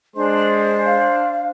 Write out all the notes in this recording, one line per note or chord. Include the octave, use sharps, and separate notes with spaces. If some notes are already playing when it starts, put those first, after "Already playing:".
G#3 D4 C5 C6
F5